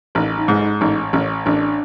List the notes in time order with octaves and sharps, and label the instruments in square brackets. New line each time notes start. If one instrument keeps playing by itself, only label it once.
[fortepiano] A1 [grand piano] D#4
[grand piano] D#4
[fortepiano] G#2
[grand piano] D#4
[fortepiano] A1 [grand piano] D#4
[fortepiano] A1 [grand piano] C#4
[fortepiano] A1 [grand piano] D4